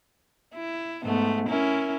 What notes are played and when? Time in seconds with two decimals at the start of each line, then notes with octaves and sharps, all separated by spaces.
0.54 E4
1.04 G#2 A3 B3
1.49 C#4 E4 A#4